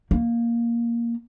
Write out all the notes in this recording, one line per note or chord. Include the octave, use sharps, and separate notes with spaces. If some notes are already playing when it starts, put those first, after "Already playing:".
A#3